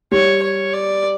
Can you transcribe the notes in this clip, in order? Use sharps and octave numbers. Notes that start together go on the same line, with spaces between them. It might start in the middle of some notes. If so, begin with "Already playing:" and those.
G3 C#5
C#5
D5